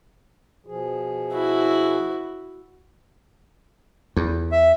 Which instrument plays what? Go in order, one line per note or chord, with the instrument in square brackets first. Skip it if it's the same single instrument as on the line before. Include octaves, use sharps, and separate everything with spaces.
[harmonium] B2 F3 G#4
[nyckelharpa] E4 F#4
[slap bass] E2
[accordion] E5